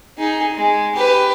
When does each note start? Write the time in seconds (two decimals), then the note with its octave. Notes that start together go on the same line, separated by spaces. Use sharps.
0.18 D#4 G#4
0.55 G#3
0.96 G4 B4